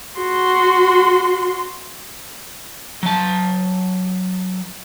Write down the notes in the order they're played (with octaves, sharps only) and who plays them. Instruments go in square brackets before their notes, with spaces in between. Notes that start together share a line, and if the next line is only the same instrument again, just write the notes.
[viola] F#4 C6
[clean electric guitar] F#3 A5